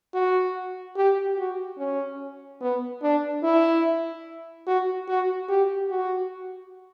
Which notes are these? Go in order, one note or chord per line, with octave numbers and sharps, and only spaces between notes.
F#4
G4
F#4
C#4
B3
D4
E4
F#4
F#4
G4
F#4